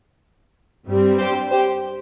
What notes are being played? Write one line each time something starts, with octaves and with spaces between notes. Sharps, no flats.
G2 G3 C4
G4 C5
G4 C5